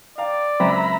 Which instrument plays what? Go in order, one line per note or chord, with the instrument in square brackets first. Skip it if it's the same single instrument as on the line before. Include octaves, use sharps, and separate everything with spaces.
[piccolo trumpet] D5 [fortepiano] F5 G5 A#5
[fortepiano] C#2 F#2 [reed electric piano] C4 [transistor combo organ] E5 A#5 B5